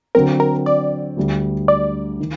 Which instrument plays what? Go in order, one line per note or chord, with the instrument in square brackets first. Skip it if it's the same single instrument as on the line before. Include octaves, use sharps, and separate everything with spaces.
[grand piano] D3 F#3 C4 [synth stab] A#4
[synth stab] A#4
D5
[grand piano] D2 D3 G3
[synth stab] D5
[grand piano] D#3